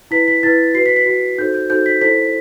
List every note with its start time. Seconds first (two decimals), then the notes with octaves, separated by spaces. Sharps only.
0.11 E4 B4 B6
0.28 B6
0.43 E4 B4 A6
0.74 F#4 C7
0.78 B4
0.86 B6
0.96 B6
1.06 F#4 B4
1.38 D#4 F#4 A4 C5 G6
1.54 G6
1.70 D#4 F#4 A4 C5 G6
1.86 B6
2.01 E4 A4 C5 B6